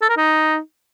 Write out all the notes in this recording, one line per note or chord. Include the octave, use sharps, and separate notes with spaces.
A4
A#4
D#4